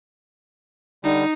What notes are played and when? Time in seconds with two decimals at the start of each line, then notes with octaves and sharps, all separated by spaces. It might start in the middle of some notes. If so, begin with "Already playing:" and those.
1.04 D3 G3 D#4